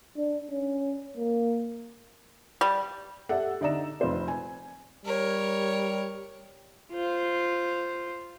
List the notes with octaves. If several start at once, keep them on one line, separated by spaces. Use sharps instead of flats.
D4
C#4
A#3
G3
G4 A4 D5 E5 F#5
D3 D#4 D5 E5 A#5 E7
F1 F4 B4 C5 D5
G#5
G3 A#4 C#5
F4 C5